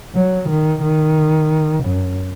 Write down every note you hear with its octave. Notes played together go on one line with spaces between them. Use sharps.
F#3
D#3
D#3
F#2